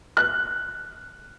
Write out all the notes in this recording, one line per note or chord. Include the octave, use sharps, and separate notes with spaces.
F#6